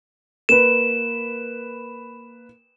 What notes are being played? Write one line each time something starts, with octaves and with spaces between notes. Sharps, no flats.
A#3 B4 E7